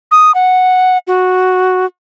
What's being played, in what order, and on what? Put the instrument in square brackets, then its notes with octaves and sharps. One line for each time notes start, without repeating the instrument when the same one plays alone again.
[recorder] D#6
F#5
F#4